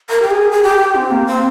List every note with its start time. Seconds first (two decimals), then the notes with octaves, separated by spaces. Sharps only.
0.10 A#4
0.22 G4
0.31 G#4
0.51 G#4
0.63 G4
0.95 C4
1.11 A#3
1.27 C4